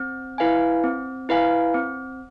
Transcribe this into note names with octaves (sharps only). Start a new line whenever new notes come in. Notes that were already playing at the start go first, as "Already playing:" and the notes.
Already playing: C4
E4 B4 F5 G#5
C4
E4 B4 F5 G#5
C4